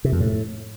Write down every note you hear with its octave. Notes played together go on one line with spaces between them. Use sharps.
C3
F2
A2